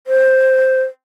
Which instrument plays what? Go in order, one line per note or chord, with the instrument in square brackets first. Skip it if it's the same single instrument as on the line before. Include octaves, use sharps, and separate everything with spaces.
[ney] C5